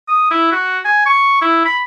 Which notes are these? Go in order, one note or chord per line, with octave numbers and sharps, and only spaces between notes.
D#6
E4
F#4
G#5
C#6
E4
B5